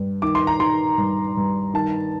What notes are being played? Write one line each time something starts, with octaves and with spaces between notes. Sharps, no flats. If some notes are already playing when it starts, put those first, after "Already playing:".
Already playing: G2
D#3 D6
C6
A#5
D#3 C6
G2
G2
D#3 A5